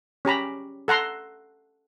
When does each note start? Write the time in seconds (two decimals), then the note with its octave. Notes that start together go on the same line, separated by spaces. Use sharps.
0.25 C#4 G4 A#5 B5
0.88 A4 F#5 A#5 C6